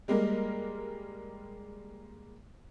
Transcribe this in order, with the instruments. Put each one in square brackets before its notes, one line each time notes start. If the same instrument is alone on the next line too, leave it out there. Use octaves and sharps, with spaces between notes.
[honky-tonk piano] G3 G#3 A#3 A#4